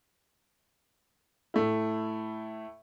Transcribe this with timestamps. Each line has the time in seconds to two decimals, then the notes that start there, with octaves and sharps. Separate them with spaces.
1.54 A2 A3 E4